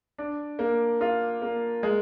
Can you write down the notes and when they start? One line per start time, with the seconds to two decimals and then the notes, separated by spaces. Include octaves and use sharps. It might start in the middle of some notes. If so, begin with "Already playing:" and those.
0.18 D4
0.59 A#3
1.01 F4
1.42 A#3
1.83 G#3